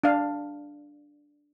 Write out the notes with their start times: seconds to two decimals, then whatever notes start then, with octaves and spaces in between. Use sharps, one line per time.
0.04 D4 F5